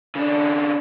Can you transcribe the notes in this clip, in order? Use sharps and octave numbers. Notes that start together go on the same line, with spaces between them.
C#3 D4